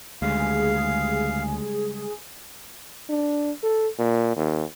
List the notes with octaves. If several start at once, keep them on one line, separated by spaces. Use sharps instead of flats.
D2 C#3 G3 G#3 G#4 F5
D4
A4
A#2
D#2